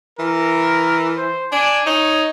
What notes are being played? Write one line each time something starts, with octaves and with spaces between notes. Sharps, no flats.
E3 A#4
C5
D4 G#5
D#4 C#5